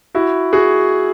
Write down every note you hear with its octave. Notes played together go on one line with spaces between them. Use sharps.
E4 F#4
F#4 G#4